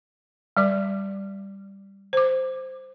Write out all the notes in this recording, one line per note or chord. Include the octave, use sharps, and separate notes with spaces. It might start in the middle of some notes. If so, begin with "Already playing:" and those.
G3 D5 D6
C5 D6